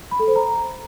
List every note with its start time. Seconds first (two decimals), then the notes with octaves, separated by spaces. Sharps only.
0.11 B5
0.20 A4
0.28 C5
0.36 A#5